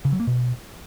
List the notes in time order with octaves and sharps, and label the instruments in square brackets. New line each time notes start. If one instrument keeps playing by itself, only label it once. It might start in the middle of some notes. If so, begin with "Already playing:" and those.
[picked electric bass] C#3
F#3
A#3
B2